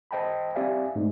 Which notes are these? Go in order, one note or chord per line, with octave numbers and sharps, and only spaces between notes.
C5 D#5 G5 A5 B5
C4 G4 D5 E5 F5 G#5
G#2 G#3 A3